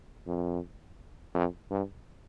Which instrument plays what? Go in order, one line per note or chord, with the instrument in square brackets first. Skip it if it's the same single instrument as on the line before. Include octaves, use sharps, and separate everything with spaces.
[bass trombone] F2
F2
G2